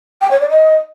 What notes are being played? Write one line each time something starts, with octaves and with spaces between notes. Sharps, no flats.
G5
C#5
D5
D#5